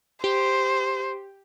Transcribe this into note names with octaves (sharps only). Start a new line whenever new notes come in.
G4 C5